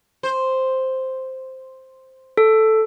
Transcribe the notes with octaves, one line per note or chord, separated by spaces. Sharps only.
C5
A4